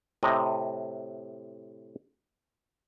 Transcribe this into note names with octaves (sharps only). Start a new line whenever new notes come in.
A2 C3 D#5